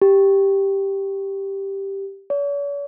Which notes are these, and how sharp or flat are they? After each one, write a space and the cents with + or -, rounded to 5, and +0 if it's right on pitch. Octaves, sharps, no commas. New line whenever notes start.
G4 +0
C#5 +45